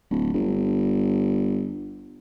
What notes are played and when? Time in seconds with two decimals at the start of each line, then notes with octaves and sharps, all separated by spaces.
0.10 D1
0.34 G1